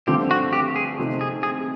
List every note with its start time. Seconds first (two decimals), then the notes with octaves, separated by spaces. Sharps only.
0.07 G2 D3 F3 A3 C4 G4
0.31 F#4
0.53 G4
0.76 G#4
0.99 C3 F3 A3 C4 D#4
1.21 G#4
1.43 G#4